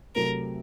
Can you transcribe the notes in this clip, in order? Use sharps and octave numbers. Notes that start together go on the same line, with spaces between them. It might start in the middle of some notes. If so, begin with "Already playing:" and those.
C3 F#3 A3 C4 A#4